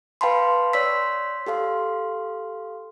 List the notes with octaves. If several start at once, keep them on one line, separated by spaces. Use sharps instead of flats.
B4 F5 G5 A5 B5 C6
C#5 D5 C6 E6 B6
G4 A4 F5 C6